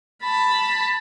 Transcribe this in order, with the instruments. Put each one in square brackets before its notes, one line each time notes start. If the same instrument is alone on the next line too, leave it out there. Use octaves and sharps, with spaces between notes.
[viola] A5 B5